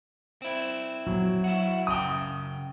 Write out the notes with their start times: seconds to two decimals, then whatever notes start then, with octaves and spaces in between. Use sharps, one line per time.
0.42 C4 E4
1.07 F#3
1.44 E4 F#4
1.87 F#2 C#3 G5 D#6